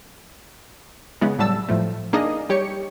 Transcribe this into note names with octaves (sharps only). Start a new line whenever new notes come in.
C#3 E3 G#3 B3
A2 F#3 G3 A5 E6
A2 F3 A3
A#3 D4 D#4 G#4 D#5
G3 G4 C#5 C#7